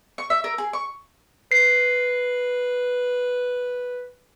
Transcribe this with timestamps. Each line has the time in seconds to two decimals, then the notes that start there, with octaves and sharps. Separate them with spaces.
0.18 C#6
0.30 E5
0.44 A#4
0.58 G#4
0.73 C#6
1.52 B4 C7